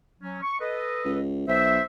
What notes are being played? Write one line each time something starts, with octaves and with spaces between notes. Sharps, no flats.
F#3 C#4
C#6
A4 B4 D#5
C#2
B1 C5 E5